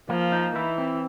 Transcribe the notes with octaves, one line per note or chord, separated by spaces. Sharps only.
F3 A#3
D#4
E3 E4
C4